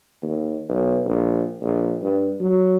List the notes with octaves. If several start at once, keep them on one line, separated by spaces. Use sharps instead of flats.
D#2
B1
A#1
A#1
G2
F#3